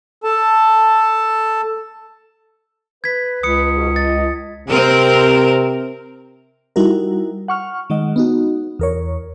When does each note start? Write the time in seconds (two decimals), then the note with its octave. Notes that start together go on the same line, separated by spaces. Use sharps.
0.24 A4 A5
3.04 B4 G#6 B6
3.43 C#2 D#6 C#7
3.75 G#2 B2
3.96 D#5 A6
4.68 C3 C4 A#4
6.76 G3 D#4 E4 F#4 A#4
7.48 F#5 C#6 F6
7.90 D#3 G#3 D#5 F#5
8.16 B3 D#4 F#4
8.79 E2 A#4 C#5